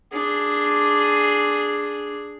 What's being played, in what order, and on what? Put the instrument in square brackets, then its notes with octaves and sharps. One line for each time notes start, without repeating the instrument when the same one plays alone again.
[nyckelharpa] D4 G#4